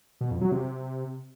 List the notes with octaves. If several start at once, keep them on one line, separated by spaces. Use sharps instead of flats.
B2
F2
F#3
C3